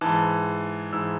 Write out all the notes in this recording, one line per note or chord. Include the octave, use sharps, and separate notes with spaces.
G#2 E3 A5
G#2 E3 E6